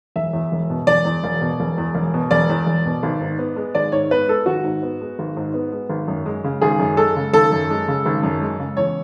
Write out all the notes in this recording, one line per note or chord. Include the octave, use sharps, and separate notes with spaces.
E1 E5
E2
E1
B2
E1 D5
E2
E1
B2
E1
E2
E1
B2
E1 D5
E2
E1
B2
G#1
G#2
B3
G#3
G#1 D5
G#2 C#5
B3 B4
G#3 A4
G#1 F#4
G#2
B3
G#3
G#1
G#2
B3
G#3
G#1
F#2
G#3
C#3
G#1 G#4
F#2
G#3 A4
C#3
G#1 A4
F#2
G#3
C#3
G#1
F#2
G#3
C#3
E2 C#5